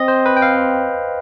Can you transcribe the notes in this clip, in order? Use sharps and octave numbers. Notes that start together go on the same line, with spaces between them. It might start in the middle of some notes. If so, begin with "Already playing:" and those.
Already playing: C4 D#5
C5
B4
G5
F5